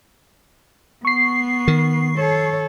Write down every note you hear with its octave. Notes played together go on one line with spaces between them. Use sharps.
B3 C#6 C7
D#3
A4 C#5